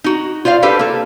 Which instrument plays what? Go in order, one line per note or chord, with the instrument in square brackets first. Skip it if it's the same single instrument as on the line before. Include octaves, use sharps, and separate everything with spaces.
[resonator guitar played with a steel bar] D#4 F#4
F4 C5 D5 F5
D4 G4 A4 B4 C5 F5
A#3 A4